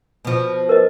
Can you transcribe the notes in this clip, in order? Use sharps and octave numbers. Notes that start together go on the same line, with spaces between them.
B2 F3
A#4 B4 D#5